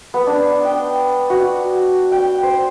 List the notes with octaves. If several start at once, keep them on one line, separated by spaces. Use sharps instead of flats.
B3
D4
G5
F#4
G5
C5